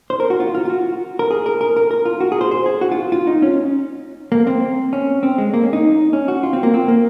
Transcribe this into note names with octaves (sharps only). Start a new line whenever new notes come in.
C5
A#4
F#4
F4
F4
F4
F#4
A#4
G#4
A#4
A#4
A#4
A#4
F4
F#4
G#4
C5
C5
G#4
F#4
F4
F4
D#4
C#4
A#3
C4
C#4
C4
G#3
A#3
C#4
D#4
C#4
F#4
F4
C4
A#3
C4
A#3